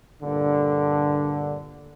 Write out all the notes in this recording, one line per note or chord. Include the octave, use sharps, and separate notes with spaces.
G2 A#2 D3